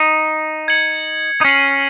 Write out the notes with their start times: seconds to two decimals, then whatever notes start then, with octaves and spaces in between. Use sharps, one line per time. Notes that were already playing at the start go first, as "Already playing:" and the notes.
Already playing: D#4
0.68 G#6 C#7 F#7
1.41 D#4
1.45 C#4 F6 C7 D#7 F#7